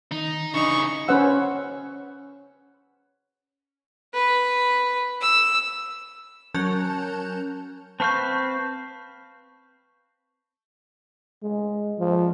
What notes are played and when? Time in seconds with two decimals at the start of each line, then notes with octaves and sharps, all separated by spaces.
0.12 D#3 D#4
0.54 C#3 E3 D4 D#4 C#6
1.08 C#4 B4 C5 F#5 E6
4.14 B4
5.22 E6
6.55 F#3 C#4 A#4 A5 F#6 G6
8.00 C4 B4 F5 A5 C#6 G6
11.43 G#3
11.98 F3